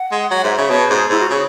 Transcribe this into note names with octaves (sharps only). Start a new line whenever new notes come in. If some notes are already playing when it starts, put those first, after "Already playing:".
Already playing: F#5
G#3
F#3 F#5
G#2 E5
C#3 E5
B2 C#5
G#2 G#4
G#2 E4
F#4
C#3 G#4